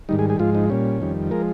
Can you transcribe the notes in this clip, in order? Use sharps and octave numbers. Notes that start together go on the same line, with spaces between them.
G#2 D#3 G3 D#4
G#4
G#4
G#2 F3 G#3 F4
D#4
A#2 G3 C#4
F2 D#3 G3
F3 G#3 A#4